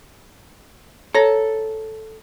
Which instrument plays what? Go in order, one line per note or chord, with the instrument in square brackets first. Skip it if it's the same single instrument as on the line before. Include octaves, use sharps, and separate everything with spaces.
[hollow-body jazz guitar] A4 [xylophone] C#5 A#5 A#6